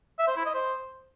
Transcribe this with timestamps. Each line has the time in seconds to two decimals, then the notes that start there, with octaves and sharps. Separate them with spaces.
0.19 E5
0.28 C5
0.37 E4
0.46 D#5
0.54 C5